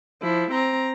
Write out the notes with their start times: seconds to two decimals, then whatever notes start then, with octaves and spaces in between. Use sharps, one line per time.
0.23 F3 E4
0.52 C4 A#5